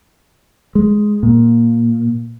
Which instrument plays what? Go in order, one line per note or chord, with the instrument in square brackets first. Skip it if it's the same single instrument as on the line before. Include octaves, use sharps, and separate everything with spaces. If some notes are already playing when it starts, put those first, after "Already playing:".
[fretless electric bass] G#3
A#2